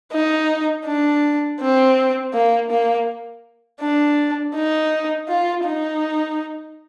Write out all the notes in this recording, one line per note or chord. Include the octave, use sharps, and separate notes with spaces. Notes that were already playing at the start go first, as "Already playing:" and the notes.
D#4
D4
C4
A#3
A#3
D4
D#4
F4
D#4